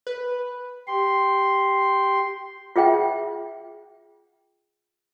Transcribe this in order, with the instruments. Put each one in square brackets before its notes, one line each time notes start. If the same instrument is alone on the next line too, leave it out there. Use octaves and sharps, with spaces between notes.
[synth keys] B4
[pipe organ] G4 C6
[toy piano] F4 G#4 E5 G5